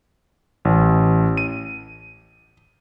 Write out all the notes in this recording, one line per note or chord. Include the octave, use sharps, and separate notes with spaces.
A1
D#7